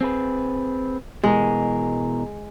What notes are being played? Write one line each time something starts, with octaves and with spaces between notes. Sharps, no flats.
C4 G#4 B4
B2 E3 G#3 A#4